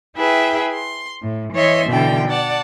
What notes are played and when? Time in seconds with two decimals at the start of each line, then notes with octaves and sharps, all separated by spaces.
0.16 E4 G#4 B4 E5 G5
0.72 C6
1.22 A2
1.54 E3 C#5 D#5 E5 C6
1.88 B2 D3 E3 G5
2.28 D5 F#5 A5